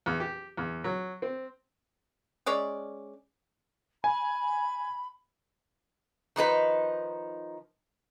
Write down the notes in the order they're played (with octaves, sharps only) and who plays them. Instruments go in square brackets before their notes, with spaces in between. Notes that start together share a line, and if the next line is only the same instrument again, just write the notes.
[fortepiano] E2
G4
E2
F#3
C4
[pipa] G#3 C#4 D5
[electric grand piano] G#5 [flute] B5
[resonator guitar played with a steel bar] D#3 F3 D#4 B4